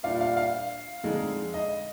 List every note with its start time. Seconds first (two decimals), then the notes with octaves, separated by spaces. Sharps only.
0.03 A#2 G3 D4 F4 F5
0.21 F5
0.37 F5
1.03 F2 D3 G#3 D#4
1.54 D#5